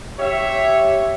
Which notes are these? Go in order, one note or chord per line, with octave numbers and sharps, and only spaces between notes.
G4 C#5 E5